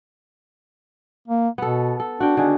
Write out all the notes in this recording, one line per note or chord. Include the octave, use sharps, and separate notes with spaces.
A#3
B2 B3 A4
A4
D4 F#4 G5
D3 D#3 D4 G#4